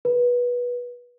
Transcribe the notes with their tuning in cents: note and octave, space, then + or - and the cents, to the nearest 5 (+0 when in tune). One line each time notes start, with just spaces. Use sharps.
B4 -20